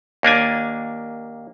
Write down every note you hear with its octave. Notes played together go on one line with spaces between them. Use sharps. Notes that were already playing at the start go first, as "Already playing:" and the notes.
D#2 A#3 D4 G#5